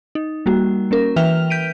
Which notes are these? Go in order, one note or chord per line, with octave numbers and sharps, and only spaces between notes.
D#4
G3 A#3 F#4
A#3 C#4 A#4
E3 B4 E5 G5 F6 F7
G6 B6 D7 D#7